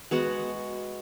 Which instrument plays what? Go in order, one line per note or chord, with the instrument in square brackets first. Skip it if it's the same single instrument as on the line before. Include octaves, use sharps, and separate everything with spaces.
[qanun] G#3 B3 F#4 F#5